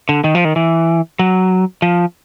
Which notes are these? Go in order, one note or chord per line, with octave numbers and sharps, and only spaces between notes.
D3
D#3
F3
D#3
E3
F#3
F3